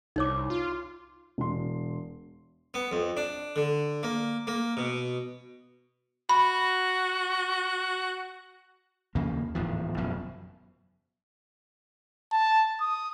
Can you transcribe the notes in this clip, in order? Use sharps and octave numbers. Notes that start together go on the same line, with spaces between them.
C2 D#4 C#5 D6
F4
E1 C6
B3
F2
D4
D3
A#3
A#3
B2
F#4 B5
D#2 C#3 F3 A#3
D1 E2 G#2 F3
F#1 F#2 B2 F3
A5
D#6